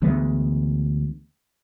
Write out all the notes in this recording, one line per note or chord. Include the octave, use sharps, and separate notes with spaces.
D2 E3 G#3 B3